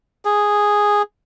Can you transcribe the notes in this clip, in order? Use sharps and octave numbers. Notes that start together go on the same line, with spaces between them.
G#4